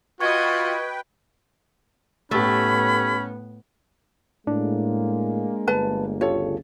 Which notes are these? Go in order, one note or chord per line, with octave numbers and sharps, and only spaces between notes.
F4 F#4 B4 D#5 G5 C#6 G#6
A2 A3 B3 C#4 G4 B5
A2 G#3 A#3 D4
G1 B4 A5
D2 C#3 F4 G4 A4 C#5